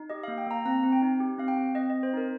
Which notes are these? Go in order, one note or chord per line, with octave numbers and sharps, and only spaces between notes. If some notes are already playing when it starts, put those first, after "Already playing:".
Already playing: D#4
G4 D#5
F5
A#3
G5
A#3 A#5
C4 A#5
C4
G5
D#4
G4
C4 F5
G5
C4
C4 D#5
D#5
C4
C5
D#4 A#4